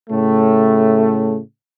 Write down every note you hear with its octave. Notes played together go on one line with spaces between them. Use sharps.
A2 C#3 A3